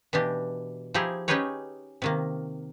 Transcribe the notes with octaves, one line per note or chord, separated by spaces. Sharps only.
B2 E3 D4 G4
F3 D#4 E4 G4 G#4
C#4 D#4 G4 G#4 B4 C#5
C3 D#3 A#3